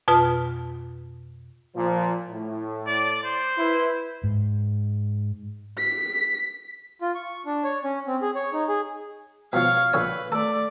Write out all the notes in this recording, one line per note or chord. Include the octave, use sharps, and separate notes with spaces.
F2 B2 F4 B4 F6
A#2 F3
A2
D5
C5
E4 B4
G#2
B6
F4
C#6
D4
C#5
C#4
C4
G#4
C#5
D#4
G#4
B2 F3 C#5 F5
A#1 D3 B4 C#5
A3 A4 D5